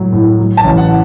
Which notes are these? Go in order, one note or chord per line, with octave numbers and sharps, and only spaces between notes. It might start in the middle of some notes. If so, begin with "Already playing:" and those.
Already playing: A2 F#3
A2
F#3
A5
A1
F#5